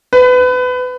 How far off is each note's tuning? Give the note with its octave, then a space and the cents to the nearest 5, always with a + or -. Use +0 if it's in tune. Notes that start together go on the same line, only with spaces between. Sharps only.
B4 +25